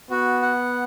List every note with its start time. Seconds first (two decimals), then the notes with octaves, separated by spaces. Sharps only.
0.10 B3 F#4
0.42 F#5